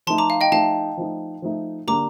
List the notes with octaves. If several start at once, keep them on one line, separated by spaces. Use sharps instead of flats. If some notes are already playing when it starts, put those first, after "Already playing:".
F3 A3 D#4 A5 C6
A#5 D6
F5
D#5 G5
F3 A3 D#4 F5 A5
F3 A3 D#4
F3 A3 D#4
D3 G3 A#3 D4 G4 A#5 D6